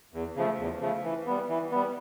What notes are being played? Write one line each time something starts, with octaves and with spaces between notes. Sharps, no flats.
E2
C#3 F3 A3
E2
C#3 F3 A3
E3
G3 B3
E3
G3 B3